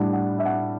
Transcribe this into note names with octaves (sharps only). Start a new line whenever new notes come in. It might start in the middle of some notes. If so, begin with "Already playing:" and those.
Already playing: A2 G3 D4 F#5
F#5
E5
F#5